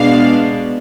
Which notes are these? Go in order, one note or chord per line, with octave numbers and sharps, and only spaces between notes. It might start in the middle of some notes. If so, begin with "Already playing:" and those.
Already playing: B2 G#3 B3 D4 F5